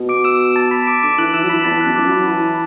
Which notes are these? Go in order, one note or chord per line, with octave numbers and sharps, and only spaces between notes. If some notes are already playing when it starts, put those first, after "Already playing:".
Already playing: B2
D6 D7
E6 E7
A5 A6
B5 B6
E7
D6 D7
D3 D6 D7
E3 F#6 F#7
E3 E6 E7
F#3
E3 B5 B6
E2 A5 A6
F#2 F#6
E3 D6
F#3
B5
E3 A5
B5